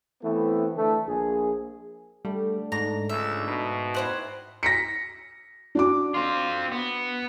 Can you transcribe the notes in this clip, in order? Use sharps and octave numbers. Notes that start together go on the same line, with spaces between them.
E3 A3 B3 C4
D3 E3 A3
A#1 G#4
D3 G3 A3
G#2 D4 A#5
C#2 E5
B2 D#4 C5
E4 G4 B4 C5 F#6
A#6 B6 C#7
D4 F#4 D6
C4 F4
B3